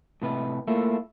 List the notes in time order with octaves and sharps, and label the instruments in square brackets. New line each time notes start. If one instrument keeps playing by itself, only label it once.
[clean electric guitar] A2 C3 B4
[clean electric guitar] A3 E4 F4 [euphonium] A#3